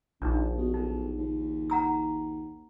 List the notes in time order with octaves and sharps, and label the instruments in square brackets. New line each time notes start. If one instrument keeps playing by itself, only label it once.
[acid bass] A#1 [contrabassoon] D#2 [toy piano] D4 D#4
[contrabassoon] B2
[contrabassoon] B1 [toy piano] D#4
[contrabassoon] D#2
[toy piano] F#5 A#5 E6